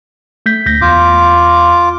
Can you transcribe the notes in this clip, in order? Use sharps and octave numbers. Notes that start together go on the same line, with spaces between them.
A3 G6 B6
D2 G6 A#6
E2 F4 D6